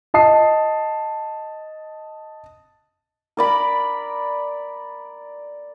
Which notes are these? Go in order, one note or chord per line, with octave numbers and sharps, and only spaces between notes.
D#5 A5 D#6 C7
A#4 D5 B5